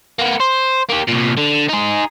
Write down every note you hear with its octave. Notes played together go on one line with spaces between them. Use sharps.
A#3 B3
C5
A#3 G4
C2 A#2
D3
D#4 G#4